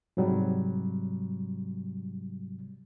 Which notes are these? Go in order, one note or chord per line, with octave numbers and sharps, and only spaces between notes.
G#2 C3 F#3 G3